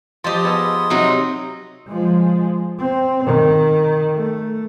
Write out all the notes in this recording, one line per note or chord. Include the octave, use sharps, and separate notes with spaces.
F3 G4 D#5 A5 C6 D#6
B3 G#4 D#5 E6
C3 F#3 C4 D#4 F#4 F5
F3 G#3
C4
D#3
A3